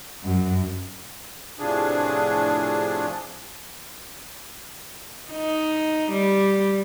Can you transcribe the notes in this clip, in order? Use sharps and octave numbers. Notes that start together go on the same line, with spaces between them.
F#2
A2 C3 F3 D4 G#4
D#4
G3